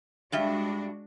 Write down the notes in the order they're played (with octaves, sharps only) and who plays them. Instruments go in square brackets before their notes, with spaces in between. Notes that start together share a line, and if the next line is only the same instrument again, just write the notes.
[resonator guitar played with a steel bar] G2 G3 E5 [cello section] G#3 D4 F#4